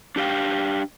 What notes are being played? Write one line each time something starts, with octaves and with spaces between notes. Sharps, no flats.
D4 G4 D#5 F5 G5